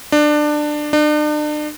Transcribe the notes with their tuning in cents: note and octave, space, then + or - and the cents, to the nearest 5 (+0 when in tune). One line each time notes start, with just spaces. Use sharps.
D4 +20
D4 +40